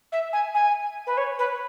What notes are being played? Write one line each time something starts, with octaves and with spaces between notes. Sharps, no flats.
E5
G#5
G#5
B4
C#5
B4